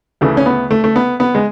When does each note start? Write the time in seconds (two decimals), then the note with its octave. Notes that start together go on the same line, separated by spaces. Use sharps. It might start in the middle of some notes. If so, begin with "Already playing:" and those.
0.21 D2 C#3 E3 A3
0.37 C#4
0.46 B3
0.71 A3
0.84 A3
0.96 B3
1.20 B3
1.35 G#3